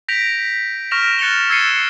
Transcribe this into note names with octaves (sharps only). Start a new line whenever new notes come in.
G6 A#6 B6 D7 F7
C#6 F6 A#6 D7 E7 F7
F#6 A6 C#7 E7 F7 G7
E6 G#6 A6 C7 C#7 D#7